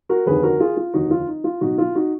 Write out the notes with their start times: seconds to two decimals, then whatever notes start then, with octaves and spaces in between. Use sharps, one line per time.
0.09 F#4 A#4
0.26 F1 D#2 D3 G#4 B4
0.43 F#4 A#4
0.60 F4 G#4
0.77 F4
0.94 F1 D#2 D3 D#4 F#4
1.11 F4
1.27 D#4
1.44 F4
1.61 B1 B2 D#4 F#4
1.78 F4
1.95 D#4 F#4